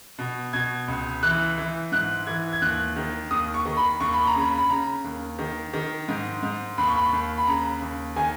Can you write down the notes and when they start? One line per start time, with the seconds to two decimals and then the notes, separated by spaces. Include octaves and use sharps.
0.19 B2
0.53 B2 G#6
0.88 C#2
1.23 E3 F#6
1.58 E3
1.92 G#2 F#6
2.27 E3 G#6
2.53 G#6
2.61 D#2 F#6
2.96 D#3
3.31 D#2 D#6
3.54 C#6
3.65 D#3
3.77 B5
4.00 D#2 C#6
4.13 B5
4.27 A#5
4.35 C#3
4.40 B5
4.58 B5
4.70 C#3 A#5
5.04 D#2
5.39 D#3
5.74 D#3
6.08 G#2
6.43 G#2
6.78 D#2 B5
6.87 C#6
6.96 B5
7.12 D#2
7.38 B5
7.47 C#3 A#5
7.82 D#2
8.16 D#3 G#5